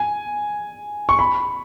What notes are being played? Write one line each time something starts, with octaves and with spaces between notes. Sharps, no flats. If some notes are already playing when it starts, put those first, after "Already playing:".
Already playing: G#5
C#6
B5